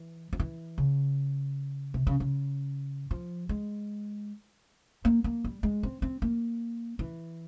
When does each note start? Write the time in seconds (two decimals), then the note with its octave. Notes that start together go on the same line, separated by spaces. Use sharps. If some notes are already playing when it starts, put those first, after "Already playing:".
Already playing: E3
0.33 F3
0.39 E3
0.78 C#3
1.94 C3
2.07 C#3
2.20 C#3
3.11 F3
3.49 G#3
5.05 A#3
5.24 A#3
5.44 G3
5.63 G#3
5.83 C4
6.02 C4
6.22 A#3
6.99 E3